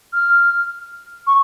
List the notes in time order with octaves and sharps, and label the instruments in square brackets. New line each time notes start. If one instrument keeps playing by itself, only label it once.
[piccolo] F6
C#6